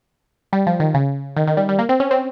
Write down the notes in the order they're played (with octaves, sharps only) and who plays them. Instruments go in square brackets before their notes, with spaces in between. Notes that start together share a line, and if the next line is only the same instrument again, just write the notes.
[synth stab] G3
F3
D#3
C#3
D#3
D#3
G3
G3
A#3
C4
C#4
C4